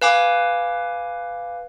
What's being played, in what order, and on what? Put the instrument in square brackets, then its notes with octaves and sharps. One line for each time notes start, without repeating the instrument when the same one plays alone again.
[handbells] B4 F5 G#5 D6